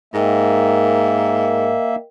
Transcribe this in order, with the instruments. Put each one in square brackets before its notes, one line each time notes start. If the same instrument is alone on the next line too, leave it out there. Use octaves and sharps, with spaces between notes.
[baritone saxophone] G#2 [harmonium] A#3 E5 [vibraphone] A#4 D#5 G5